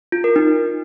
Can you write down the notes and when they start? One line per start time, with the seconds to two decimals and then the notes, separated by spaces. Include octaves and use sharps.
0.12 F4
0.24 A#4
0.36 D#4